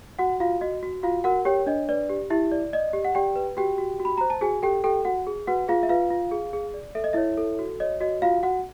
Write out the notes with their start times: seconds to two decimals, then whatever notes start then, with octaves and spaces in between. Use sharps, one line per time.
0.19 F#4 F#5
0.40 F4 F#4 F5
0.61 F#4 D#5
0.83 F#4
1.03 F4 F#4 F5
1.24 F#4 A#4 F#5
1.45 G4 C#5 G5
1.66 D4 D#5
1.89 B4 D5
2.10 G4
2.30 E4 G4 E5
2.52 D5
2.73 D5 D#5
2.93 G4
3.05 F#5
3.15 G4 D5 G5
3.36 B4
3.57 F#4 G4 G5
3.78 F#4
4.00 F#4
4.05 B5
4.18 C5 A#5
4.30 A5
4.41 F#4 G#4 G#5
4.62 G4 A4 G5
4.84 G4 A4 G5
5.05 F#4 F#5
5.27 G#4
5.47 F#4 B4 F#5
5.68 F4 G#4 F5
5.83 E5
5.89 F4 B4 F5
6.10 F4
6.31 G#4
6.53 G#4
6.74 D5
6.95 A4 E5
7.04 D#5
7.13 E4 C#5 E5
7.37 A4
7.59 F#4
7.80 C#5 D#5
8.01 F#4 D#5
8.22 F4 F#4 F5
8.43 F#4 F#5